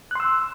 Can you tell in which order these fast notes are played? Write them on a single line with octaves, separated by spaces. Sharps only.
F#6 C6 E6